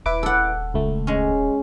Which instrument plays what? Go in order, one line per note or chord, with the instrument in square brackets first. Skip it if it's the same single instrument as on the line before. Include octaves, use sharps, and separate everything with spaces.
[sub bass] D#1 [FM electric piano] E4 B4 D6
[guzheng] A4 F#5
[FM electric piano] C#2 A3
[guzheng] G#3 C#4